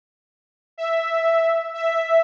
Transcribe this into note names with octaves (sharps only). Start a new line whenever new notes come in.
E5
E5